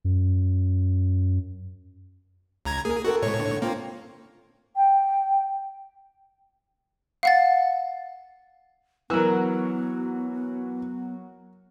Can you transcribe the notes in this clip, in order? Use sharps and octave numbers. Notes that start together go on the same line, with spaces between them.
F#2
C#2 A#5 G#6
A#3 G#4 A#4
C4 F#4 A4 A#4
A2 C3 G#3 B3 C#5
D3
A#3 C4 F4
G5
F5 F#5 A6
E3 F#3 B3 F#4 A#4 E6